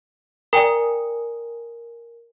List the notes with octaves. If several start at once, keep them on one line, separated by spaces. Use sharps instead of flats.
A#4 D5 G5 G#5 A#5